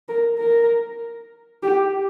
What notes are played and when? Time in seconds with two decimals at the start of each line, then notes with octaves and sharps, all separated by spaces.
0.09 A#4
0.39 A#4
1.63 G4